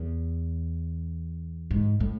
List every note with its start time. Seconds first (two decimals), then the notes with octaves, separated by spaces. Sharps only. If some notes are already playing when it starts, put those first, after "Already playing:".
Already playing: E2
1.71 G#2
2.00 A2